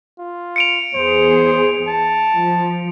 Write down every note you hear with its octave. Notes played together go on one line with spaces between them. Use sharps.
F4
C#7 D7 F7
E2 G#4 C5
A5
F3